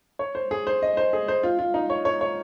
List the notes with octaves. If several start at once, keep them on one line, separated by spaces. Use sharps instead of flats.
C#5
C5
G#4
C5
D#5
C5
G#4
C5
F4
F4
D#4
C#5
C#5
C#5